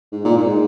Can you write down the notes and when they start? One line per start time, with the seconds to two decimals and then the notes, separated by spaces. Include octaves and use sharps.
0.12 G#2
0.25 A#2
0.37 G#2